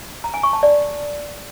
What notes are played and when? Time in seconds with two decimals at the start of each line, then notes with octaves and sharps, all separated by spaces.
0.24 A#5
0.34 G#5
0.43 C#6
0.53 A5
0.63 D5